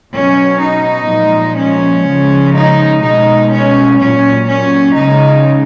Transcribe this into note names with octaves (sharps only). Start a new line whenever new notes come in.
B2 F#3 C#4
D#4
A#2 F3 G#3
C#4
C#3 F3 G#3
D#4
B2 G#3 D#4
C#4
A#2 F#3 C#4
C#4
C#3 G#3 D#4